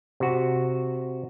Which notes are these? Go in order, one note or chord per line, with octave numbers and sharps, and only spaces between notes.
C3 F#4